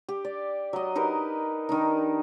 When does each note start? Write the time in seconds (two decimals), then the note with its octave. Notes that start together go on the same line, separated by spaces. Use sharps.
0.09 G4
0.25 D5
0.73 F#3 D#5
0.95 D#4 G4 A#4 B4
1.69 D#3 D4 D#4